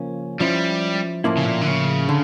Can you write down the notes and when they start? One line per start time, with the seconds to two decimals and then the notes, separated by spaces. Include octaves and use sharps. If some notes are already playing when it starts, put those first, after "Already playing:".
Already playing: C#3 F3 A#3 C#4
0.40 F3 G3 C#4 E4
1.24 A2 F3 A#3 C#4 E4
1.37 C#3
1.46 A#2
1.62 D3
1.68 C#3
2.09 D3